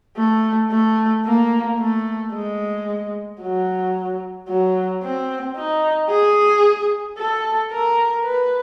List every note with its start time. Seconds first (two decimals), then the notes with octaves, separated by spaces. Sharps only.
0.17 A3
0.71 A3
1.26 A#3
1.79 A3
2.33 G#3
3.41 F#3
4.49 F#3
5.03 C4
5.57 D#4
6.10 G#4
7.18 A4
7.72 A#4
8.25 B4